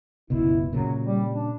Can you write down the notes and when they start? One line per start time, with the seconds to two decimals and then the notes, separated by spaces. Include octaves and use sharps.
0.30 F#1 C#2 B2 E4
0.73 A#2 C#3 F#3
1.04 G3
1.33 D4